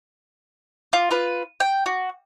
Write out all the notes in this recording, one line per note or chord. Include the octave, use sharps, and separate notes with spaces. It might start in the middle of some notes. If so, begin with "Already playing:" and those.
F4
F4 B4
G5
F#4